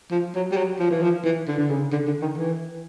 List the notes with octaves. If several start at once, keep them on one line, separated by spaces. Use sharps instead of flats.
F3
F#3
G3
F#3
F3
E3
F3
E3
D3
D3
C#3
D3
D3
D#3
E3